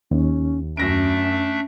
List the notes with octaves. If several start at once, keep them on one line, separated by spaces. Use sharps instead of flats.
D#2 C#4
F#2 A3 C#4 D4 E5 A#6 D7